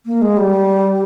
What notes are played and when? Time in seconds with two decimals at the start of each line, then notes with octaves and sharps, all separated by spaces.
0.06 A#3
0.22 G#3
0.37 G3